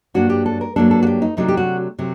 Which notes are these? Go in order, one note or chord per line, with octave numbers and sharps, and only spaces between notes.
G2 F#3 A#3 D4 F#4
G4
A4
A#4
G2 F#3 A#3 D4 A4
A4
F#4
G4
D#4
C3 F#3 A3 D4 D#4
G4
F#4
C3 F#3 A3